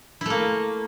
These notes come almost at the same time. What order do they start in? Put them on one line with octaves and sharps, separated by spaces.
E4 A3 A#3